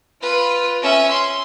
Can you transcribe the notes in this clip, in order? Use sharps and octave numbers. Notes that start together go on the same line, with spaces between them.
F4 B4
C#4 E5
C6